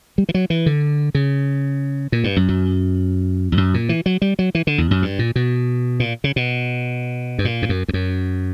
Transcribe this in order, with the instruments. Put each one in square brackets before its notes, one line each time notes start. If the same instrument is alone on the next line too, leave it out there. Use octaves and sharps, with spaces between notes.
[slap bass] G3
E3
F#3
E3
D3
C#3
A#2
G2
F#2
F#2
E2
F#2
A#2
E3
F#3
G3
F#3
E3
D3
E2
F#2
G2
A#2
B2
A#2
C#3
B2
G2
A#2
G2
F#2
E2
F#2